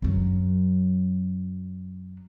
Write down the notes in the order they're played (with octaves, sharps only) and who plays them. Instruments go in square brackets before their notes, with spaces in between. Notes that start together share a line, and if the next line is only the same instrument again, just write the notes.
[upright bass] F#2 F#3